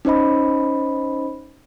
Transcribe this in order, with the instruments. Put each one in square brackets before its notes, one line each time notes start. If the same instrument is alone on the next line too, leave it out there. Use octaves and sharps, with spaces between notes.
[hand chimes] C#4 D#4 C5 D#5 B5